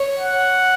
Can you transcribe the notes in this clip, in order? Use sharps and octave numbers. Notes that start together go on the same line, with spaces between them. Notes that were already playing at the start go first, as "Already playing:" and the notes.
Already playing: C#5
F#5